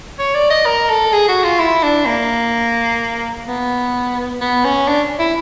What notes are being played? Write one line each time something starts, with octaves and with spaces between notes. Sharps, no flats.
C#5
D5
D#5
A#4
A4
G#4
F#4
F4
E4
D4
A#3
B3
B3
C#4
D4
E4